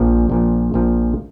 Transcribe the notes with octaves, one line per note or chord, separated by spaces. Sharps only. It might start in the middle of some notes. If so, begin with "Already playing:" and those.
Already playing: A#1 A#2 F3
A#1 A#2 F3
A#1 A#2 F3